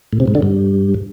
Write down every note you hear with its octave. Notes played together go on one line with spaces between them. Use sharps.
A2
C3
G#2
D3
G2